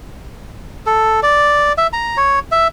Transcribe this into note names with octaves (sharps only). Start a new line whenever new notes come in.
A4
D5
E5
A#5
C#5
E5